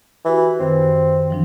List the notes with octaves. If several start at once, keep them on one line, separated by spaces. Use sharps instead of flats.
E3 F#4 G4 B5
F#2 D#3 C4
E3 F3 D4